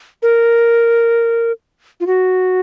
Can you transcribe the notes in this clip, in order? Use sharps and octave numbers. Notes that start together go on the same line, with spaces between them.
A#4
F4
F#4